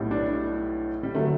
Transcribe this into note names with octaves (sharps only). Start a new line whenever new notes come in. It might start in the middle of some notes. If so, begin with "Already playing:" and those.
Already playing: B1 A2 G3
D4
G3
D3 F#3 A3